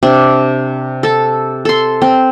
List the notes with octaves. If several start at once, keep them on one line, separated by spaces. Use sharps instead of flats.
C3 D4
A4 A5
A4 C6
C4